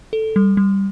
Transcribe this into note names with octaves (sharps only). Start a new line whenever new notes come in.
A4
G3
G3